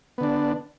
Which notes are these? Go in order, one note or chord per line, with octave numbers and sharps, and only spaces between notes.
D3 B3 D4